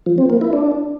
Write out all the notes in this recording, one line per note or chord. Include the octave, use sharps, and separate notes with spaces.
F3
C4
A#3
E4
D4